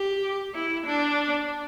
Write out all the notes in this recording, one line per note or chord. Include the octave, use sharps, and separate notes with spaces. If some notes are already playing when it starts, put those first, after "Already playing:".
Already playing: G4
E4
D4